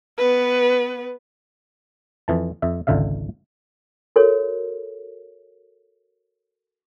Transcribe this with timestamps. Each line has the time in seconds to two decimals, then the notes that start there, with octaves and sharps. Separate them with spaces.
0.18 B3 B4
2.28 F2 E3 A5
2.62 F2 E5
2.87 G#1 C#2 D3 E5 F5
4.16 F#4 A4 A#4 C#5